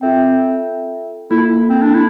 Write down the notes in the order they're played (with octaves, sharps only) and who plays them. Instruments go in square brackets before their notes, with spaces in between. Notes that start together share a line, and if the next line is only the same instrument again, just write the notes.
[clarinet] C4 [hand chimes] F4 A4 E5 G5
[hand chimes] A#3 F4 A4 [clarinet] E4
[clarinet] C4
D4
E4